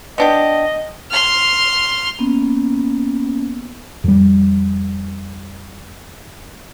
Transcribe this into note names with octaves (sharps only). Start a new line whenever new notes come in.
B3 D4 G4 D#5
C6 F6
A#3 B3 C#4
F2 G3